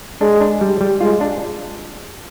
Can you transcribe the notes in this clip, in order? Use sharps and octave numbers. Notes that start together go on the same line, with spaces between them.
G#3 D4
D4
G3
G3
G#3 F4
D4